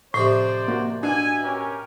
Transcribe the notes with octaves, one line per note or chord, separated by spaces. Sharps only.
A2 C3 F3 D#4 C5 D5
A#3 F#4
B2 D4 E5 G#5
C#4 G4 A#4